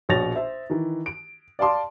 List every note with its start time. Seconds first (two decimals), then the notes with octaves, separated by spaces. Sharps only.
0.09 A#1 B2 C#5 A6 A#6 F7
0.36 C5 E5
0.70 D#3 E3
1.06 D7
1.59 D5 F5 A5 C6 D6